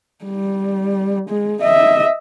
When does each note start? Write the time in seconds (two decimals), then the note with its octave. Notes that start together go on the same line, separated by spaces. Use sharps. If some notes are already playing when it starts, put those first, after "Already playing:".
0.25 G3
1.29 G#3
1.62 D#5 E5